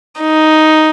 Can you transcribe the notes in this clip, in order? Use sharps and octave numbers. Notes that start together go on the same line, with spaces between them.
D#4